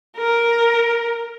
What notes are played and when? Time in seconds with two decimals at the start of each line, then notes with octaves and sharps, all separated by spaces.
0.17 A#4